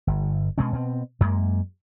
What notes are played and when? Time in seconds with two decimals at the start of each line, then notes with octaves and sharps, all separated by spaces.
0.07 G1
0.58 B2 G#3 C4 C#4
0.73 B2 C4
1.21 F#2 G#3 A#3